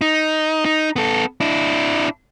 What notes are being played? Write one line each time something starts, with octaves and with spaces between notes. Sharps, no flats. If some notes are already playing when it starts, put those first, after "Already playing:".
D#4
D#4
B3 A4
D4 E4